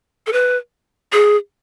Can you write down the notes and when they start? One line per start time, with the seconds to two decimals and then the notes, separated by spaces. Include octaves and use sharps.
0.26 A4
0.33 B4
1.12 G#4